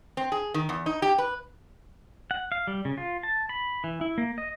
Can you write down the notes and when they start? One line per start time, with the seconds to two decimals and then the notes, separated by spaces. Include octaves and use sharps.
0.17 C4
0.32 G#4
0.54 D#3
0.69 E2
0.86 D#4
1.02 G4
1.18 B4
2.31 F#5
2.52 F5
2.67 G3
2.85 C#3
2.98 F4
3.23 A5
3.49 B5
3.84 E3
4.01 E4
4.18 A#3
4.38 D#5